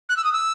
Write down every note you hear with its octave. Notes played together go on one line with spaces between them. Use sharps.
F#6
E6
D#6
E6